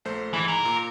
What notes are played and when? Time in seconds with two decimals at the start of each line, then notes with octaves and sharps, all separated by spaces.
0.05 A#1 A3 C5
0.34 G#2 E3
0.48 A#4
0.65 A#2